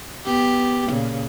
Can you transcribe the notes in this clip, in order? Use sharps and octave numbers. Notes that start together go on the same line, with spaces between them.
B3 G4
A#2 C#3